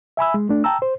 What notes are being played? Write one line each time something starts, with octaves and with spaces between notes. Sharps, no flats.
E5 G#5 B5 E6
G#3
A3 D4
G5 A5 A#5 E6
C5